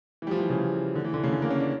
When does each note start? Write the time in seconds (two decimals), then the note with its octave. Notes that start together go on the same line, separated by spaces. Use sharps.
0.22 E3
0.27 G3
0.31 F3
0.40 E3
0.50 C#3
0.95 D3
1.04 E3
1.14 D3
1.24 C#3
1.32 D3
1.42 A#3
1.51 C#4
1.60 D4